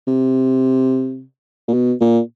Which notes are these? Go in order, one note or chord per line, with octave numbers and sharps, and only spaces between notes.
C3
A#2
B2
A#2